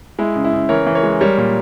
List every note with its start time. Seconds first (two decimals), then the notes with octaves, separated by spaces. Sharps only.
0.19 G#3 E4
0.36 C#3
0.44 E4
0.53 C#3
0.69 E3 A#4 C#5
0.87 E3
0.95 A#4 C#5
1.03 G#3
1.20 G3 A#4 C#5
1.37 A#2